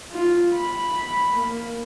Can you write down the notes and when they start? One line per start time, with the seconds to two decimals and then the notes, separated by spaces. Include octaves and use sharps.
0.12 F4
0.53 B5
1.34 A#3